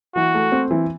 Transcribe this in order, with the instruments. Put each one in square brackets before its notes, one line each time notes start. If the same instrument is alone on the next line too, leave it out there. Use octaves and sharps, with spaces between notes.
[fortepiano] E3 [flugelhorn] F#4
[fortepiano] A3
C4
E3